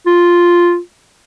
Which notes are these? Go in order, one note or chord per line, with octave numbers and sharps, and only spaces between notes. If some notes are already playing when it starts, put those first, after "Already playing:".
F4